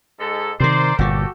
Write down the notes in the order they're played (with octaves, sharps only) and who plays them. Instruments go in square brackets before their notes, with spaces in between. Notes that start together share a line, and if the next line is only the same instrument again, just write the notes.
[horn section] G#2 A4
[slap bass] C3 D#3 [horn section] A#4 C5 D5
[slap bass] G1 A#2 [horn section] F#4 G4 A4